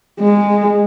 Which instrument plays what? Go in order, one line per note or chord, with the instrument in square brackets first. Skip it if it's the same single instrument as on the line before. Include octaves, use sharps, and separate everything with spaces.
[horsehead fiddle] G#3